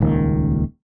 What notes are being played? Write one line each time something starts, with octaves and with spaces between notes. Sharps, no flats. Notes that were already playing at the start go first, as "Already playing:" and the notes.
D#1 C#2 D#3 A#3